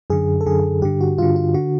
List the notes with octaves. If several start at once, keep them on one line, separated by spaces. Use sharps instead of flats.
F#2 D3 G#4
A4
F#2 D3 G#4
G2 D3 G4
F#4
G2 D3 F4
F4
D3 F#4